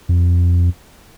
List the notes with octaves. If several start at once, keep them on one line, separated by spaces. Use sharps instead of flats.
F2